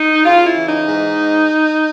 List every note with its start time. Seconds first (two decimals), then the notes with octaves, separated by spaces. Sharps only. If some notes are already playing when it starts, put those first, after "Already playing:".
Already playing: D#4
0.24 C#3 F4
0.45 E4
0.56 E3
0.67 D#4
0.87 G#2